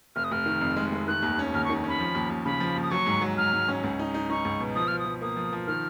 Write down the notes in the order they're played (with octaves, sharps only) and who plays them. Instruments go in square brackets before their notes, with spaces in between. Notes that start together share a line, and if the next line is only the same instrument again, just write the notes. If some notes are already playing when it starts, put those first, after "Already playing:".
[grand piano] F1 [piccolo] F6
[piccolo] D#6
[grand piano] F1 [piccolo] F6
[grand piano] D#3
F2
G#3
F1
[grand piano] D#3 [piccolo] F#6
[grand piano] D#2
C#4
[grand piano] D#2 [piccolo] F6
[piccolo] C#6
[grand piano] D#3
[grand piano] C#4 [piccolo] B5
[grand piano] F3
D#2
D#2
[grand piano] C#3 [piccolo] B5
[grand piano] F3
D#2
[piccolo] D#6
[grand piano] F#3 [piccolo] C#6
[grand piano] G#2
F#3
[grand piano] G#2 [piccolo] F6
[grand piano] G#2
C#4
C#2
D#4
D#4
[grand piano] D#4 [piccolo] C#6
[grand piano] C#2
B2
[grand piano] F3 [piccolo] D#6
[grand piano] F3 [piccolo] F6
[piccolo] D#6
[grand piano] F3
[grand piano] A#3 [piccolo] D#6
[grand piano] F3
F3
[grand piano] D#3 [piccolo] F6